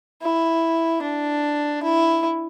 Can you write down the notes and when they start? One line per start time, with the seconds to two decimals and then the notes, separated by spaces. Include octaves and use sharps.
0.22 E4
1.03 D4
1.83 E4